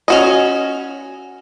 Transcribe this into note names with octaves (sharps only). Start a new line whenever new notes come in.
C#4 F#4 D#5